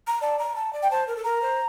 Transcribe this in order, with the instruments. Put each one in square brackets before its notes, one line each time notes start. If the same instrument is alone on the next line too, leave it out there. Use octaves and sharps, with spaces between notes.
[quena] A#5
[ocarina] D5 [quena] A5
[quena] A#5
A5
D5
[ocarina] G5
[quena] C5 [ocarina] A5
[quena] A#4
A4
[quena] A#4 [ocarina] A#5
[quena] C5